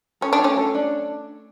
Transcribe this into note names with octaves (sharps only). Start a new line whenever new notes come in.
C#4 A4
D4
C#5
A3 C#4
A4
D4